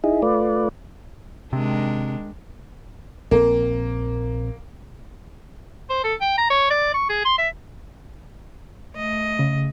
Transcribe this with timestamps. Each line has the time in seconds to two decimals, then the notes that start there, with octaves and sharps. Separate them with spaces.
0.04 D#4 E4 G#4
0.22 A3 F4 B4 D5
1.53 C3 D#3 G#3 D4
3.31 A#1 A#3 C4
5.90 C5
6.04 A4
6.21 G5
6.38 A#5
6.50 C#5
6.70 D5
6.94 C#6
7.09 G#4
7.25 C6
7.38 E5
8.95 A3 D#5
9.39 C#3